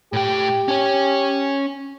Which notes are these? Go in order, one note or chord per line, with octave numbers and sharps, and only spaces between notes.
A2 G4 G5
C#4 C#5